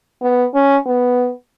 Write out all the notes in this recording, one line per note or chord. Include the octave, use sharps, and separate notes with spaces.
B3
C#4
B3